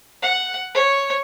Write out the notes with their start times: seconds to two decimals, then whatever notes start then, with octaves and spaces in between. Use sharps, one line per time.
0.22 F#5
0.74 C#5